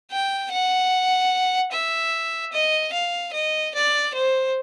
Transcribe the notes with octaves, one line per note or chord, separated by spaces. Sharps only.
G5
F#5
E5
D#5
F5
D#5
D5
C5